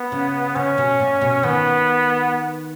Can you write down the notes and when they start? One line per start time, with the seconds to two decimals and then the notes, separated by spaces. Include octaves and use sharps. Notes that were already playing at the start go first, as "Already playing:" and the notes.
Already playing: B3
0.12 C#3
0.55 C#3 C#4
0.78 B2
1.00 A#2
1.21 B2
1.43 D#3 B3